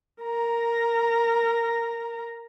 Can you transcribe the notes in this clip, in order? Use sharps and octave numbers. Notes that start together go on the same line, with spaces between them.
A#4 A#5